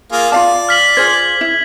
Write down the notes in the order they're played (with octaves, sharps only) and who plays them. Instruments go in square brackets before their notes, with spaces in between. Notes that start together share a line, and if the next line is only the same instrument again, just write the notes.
[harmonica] A#3 F4 G#4
[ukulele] F4 F5 A5 [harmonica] D5
[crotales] F6 B6 F#7
[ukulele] F4 G#4 C5 [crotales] F6 G#6
[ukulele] E4